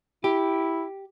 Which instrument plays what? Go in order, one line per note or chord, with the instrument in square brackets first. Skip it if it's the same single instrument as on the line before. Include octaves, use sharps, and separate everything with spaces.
[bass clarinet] E4 [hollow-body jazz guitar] G4